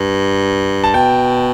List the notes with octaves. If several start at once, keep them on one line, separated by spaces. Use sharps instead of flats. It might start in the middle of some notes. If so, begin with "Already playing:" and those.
Already playing: G2
A5
B2 G5